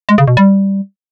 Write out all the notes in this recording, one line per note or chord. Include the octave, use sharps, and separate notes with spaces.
G#3
C#3
B2
G3